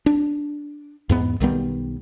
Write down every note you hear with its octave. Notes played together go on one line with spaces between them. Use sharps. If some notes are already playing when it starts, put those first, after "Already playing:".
D4
E2 G#2 B3
B1 D#3 G3 B3